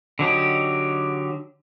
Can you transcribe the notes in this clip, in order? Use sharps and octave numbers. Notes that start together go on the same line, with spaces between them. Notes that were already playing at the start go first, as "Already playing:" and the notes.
D3 F#3 D#4 G4